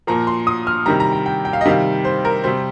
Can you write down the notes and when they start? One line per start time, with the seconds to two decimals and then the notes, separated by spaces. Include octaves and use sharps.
0.07 A#2 F3 A#5
0.27 C6
0.47 D#6
0.67 F6
0.86 C3 D#3 G3 A#5
1.00 A#5
1.12 G5
1.26 G5
1.45 G5
1.53 F5
1.61 D#5
1.65 C3 D#3 G3 F5
2.05 C5
2.25 A#4
2.44 C3 G3 C5